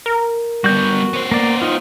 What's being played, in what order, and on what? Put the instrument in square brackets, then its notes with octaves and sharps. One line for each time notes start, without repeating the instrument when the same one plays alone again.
[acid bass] A#4
[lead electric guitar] G3 B3 [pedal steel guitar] F#4 G6
[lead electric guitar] B3 C5
[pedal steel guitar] A#3 D5
D#4 F4